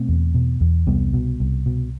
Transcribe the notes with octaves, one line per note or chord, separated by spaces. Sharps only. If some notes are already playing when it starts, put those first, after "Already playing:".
Already playing: B2 A3 C4
E2
B2
E2
C2 G3 B3
B2
C2
B2